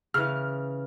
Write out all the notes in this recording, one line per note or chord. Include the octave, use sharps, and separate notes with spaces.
C#3 E3 F6